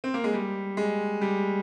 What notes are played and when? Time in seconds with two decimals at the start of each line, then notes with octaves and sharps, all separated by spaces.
0.04 C4
0.14 A#3
0.24 G#3
0.34 G3
0.77 G#3
1.21 G3